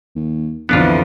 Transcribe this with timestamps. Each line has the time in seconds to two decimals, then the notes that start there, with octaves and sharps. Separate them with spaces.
0.16 D#2
0.69 B1 F2 D3 E3 B3 D4 F4